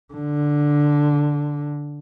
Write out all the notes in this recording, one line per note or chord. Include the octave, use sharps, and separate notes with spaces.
D3